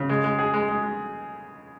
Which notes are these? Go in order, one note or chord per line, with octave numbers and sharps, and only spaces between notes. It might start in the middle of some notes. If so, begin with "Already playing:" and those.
Already playing: C#3
G#3
G#3
G#4
G#3
G#3
G#3